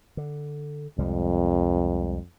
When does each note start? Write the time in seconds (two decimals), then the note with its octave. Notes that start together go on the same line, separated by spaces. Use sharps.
0.17 D3
0.98 C2 F2 G3 G#3